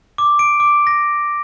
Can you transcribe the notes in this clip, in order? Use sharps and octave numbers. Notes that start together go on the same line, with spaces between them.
D6
D7
D6
A#6